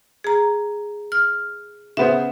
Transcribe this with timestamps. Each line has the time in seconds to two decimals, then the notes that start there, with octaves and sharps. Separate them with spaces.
0.24 G#4 A#5
1.12 F6
1.97 C#3 B3 C5 E5